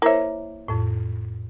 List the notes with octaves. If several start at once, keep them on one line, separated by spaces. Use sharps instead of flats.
A#3 E4 C5 C#5 E5
F2 A2